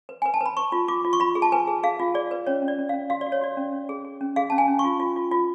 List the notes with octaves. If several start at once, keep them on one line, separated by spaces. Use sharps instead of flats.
B4
B4 G#5
A5
B4 B5
B4 C#6
F4
F4 D6
F4
C#6
F4 B5
G#4
A5
B4 G#5
G#4
G#4 F5
F4
G#4 D5
B4
C#4 C#5
C#4
D5
C#4
C#4 F5
F#4 F5
D5
F#4
C#5
F#4 D5
C#4
C#4
G#4
G#4
C#4
G#4 F5
C#4 A5
G#5
C#4
C#6
F4
F4
F4
F4